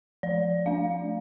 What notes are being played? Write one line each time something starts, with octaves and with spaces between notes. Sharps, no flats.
F3 D5
A3 D4 F5